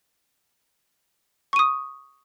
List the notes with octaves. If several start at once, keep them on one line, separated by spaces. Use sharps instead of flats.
C#6 D#6 D#7